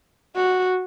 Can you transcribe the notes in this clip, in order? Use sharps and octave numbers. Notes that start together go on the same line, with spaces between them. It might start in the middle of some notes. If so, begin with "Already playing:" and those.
F#4